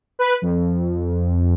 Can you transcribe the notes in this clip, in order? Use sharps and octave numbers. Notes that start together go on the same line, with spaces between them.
B4
F2